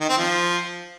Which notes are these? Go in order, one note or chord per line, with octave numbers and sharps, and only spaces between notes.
D#3
C4
F3